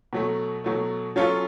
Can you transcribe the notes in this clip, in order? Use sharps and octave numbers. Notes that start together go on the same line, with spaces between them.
B2 F#3 A3
B2 F#3 A3
F#3 C#4 F4 A4